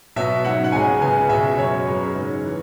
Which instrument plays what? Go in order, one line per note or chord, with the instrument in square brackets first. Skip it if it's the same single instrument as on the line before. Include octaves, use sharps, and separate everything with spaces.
[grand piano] B2 F#3 B3 E5
G#2 F#3 C#4 F#5
F#5
C#2 C#3 G#3 C#4 G#5
C#2 C#3 G#3 B3 G#5
C#2 B2 G#3 C#4 E5
F#2 F#3 C#4 C#5
F#2 C#3 G#3 B3
G#2 G#3 C#4
E3